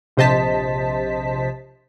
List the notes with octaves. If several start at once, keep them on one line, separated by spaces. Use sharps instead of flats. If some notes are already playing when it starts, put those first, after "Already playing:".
A#1 C3 C5 D#5 A5 B6